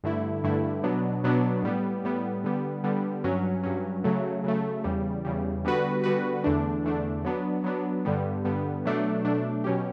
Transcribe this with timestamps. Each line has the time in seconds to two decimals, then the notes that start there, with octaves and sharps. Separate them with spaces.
0.04 G2 D3 A3 E4
0.44 G2 D3 A3 E4
0.83 B2 F#3 B3 D4
1.24 B2 F#3 B3 D4
1.63 A2 G3 B3
2.03 A2 G3 B3
2.44 D3 G3 B3
2.84 D3 G3 B3
3.24 G2 F#3 C#4
3.63 G2 F#3 C#4
4.04 C#3 F#3 A3
4.44 C#3 F#3 A3
4.84 E2 C#3 G3
5.25 E2 C#3 G3
5.65 D3 G3 B3 F#4 B4
6.04 D3 G3 B3 F#4 B4
6.44 E2 D3 A3 D4
6.84 E2 D3 A3 D4
7.25 F#3 B3 D4
7.64 F#3 B3 D4
8.05 G2 D3 G3 B3
8.45 G2 D3 G3 B3
8.85 B2 F#3 A3 D4
9.24 B2 F#3 A3 D4
9.64 B2 F#3 C#4 G4